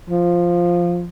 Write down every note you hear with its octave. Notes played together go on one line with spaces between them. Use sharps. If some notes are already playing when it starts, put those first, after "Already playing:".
F3